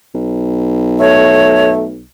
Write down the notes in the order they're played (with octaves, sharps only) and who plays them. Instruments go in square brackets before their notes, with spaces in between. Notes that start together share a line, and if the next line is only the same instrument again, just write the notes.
[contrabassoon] B1
[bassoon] A3 [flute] C#5